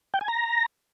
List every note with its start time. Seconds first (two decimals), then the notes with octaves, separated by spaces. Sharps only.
0.14 G5
0.21 G#5
0.28 A#5